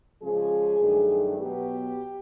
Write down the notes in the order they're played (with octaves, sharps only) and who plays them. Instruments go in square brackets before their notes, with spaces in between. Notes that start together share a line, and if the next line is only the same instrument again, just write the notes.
[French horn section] C#3 F3 G#3 C#4 G#4
G2 D#3 F#3 A3 D4
B2 F#3 B3 G4